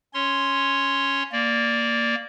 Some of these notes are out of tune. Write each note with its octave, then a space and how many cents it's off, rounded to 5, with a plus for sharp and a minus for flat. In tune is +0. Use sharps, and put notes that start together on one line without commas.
C#4 +0 C#5 +0 C6 +0
A#3 +0 D5 +0